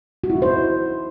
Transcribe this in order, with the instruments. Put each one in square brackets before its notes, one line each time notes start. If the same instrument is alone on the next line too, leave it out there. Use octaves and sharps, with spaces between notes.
[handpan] F#4
E4
D#4
C5